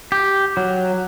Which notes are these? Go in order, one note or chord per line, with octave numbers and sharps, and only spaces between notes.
G4
F#3